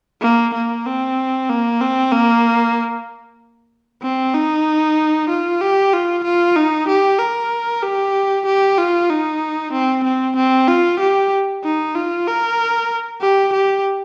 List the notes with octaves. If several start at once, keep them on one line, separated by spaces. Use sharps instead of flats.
A#3
A#3
C4
A#3
C4
A#3
C4
D#4
F4
G4
F4
F4
D#4
G4
A#4
G4
G4
F4
D#4
C4
C4
C4
F4
G4
D#4
F4
A#4
G4
G4